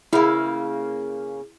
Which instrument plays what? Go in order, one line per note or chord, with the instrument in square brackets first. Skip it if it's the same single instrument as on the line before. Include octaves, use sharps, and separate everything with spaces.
[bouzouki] C#3 A#3 [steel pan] E4